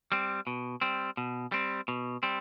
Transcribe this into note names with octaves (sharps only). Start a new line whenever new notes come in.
G3 C4
B2
G3 C4
B2
G3 C4
B2
G3 C4